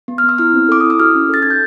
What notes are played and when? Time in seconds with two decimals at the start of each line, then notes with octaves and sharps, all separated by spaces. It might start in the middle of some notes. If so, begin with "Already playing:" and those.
0.08 B3
0.18 F6
0.24 B3
0.29 E6
0.38 E4 F6
0.53 C4
0.69 A4 D6
0.80 E4 D#6
0.90 E6
0.99 F#4 F6
1.15 C#4
1.29 A4 A6
1.43 D#4 G#6
1.50 G6